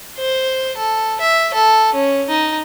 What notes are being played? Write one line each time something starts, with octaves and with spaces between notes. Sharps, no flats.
C5
A4
E5
A4
C#4
D#4